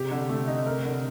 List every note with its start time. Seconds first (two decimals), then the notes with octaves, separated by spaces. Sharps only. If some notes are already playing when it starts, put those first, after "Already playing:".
Already playing: C3 G4
0.11 D3
0.29 A3
0.48 D#4
0.67 A#4
0.85 D3